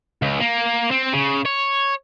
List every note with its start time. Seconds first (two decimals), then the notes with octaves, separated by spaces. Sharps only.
0.22 C#2
0.40 A#3
0.91 C4
1.13 C#3
1.45 C#5